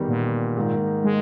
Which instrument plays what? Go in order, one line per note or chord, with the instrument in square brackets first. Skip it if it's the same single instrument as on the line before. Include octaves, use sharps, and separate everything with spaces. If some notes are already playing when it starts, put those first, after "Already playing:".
Already playing: [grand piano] E2 D#3 G3 B3
[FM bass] A#2
[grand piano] G#2 D#3 A#3
[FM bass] G#3